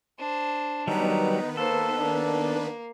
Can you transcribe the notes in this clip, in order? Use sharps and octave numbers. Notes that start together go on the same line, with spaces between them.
D4 C5
D#3 F#3 G3 B3 D#4 B4 A#5
A#3 A4 C5
A#3 D4